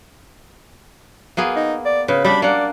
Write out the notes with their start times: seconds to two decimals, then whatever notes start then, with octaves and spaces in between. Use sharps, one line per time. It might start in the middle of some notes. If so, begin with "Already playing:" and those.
1.37 A#3 B3 G#4
1.56 D#4
1.85 D5
2.08 C#3 B4
2.24 G3 D4 B5
2.42 A#3 D5 F#5